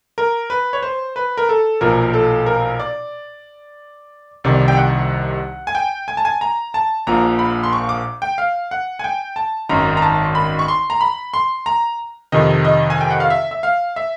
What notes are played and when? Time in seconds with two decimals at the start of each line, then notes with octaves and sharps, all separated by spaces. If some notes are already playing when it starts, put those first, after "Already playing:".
0.18 A#4
0.50 B4
0.73 C#5
0.83 C5
1.16 B4
1.38 A#4
1.49 A4
1.81 B1 A#2 F3 A#4
2.14 A4
2.46 A#4
2.79 D5
4.44 C2 C3 D#3 D5
4.68 G5
4.77 F#5
5.67 G#5
5.75 G5
6.08 G#5
6.17 A5
6.25 G#5
6.41 A#5
6.74 A5
7.07 A#1 A#2 F3 A#5
7.39 B5
7.64 C6
7.73 C#6
7.89 D6
8.22 G5
8.38 F5
8.71 F#5
8.99 G#5
9.04 G5
9.36 A5
9.69 G#1 F#2 D#3 A#5
9.97 A#5
10.02 A5
10.35 B5
10.59 C#6
10.68 C6
10.90 A#5
11.01 B5
11.34 C6
11.66 A#5
12.32 F2 C3 D#3 D#5
12.65 D#5
12.90 G#5
13.01 G5
13.10 F#5
13.20 F5
13.30 E5
13.51 E5
13.63 F5
13.96 E5